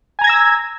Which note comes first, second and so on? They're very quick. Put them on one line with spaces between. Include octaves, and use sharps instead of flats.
G#5 A#5 G#6 A#6 E6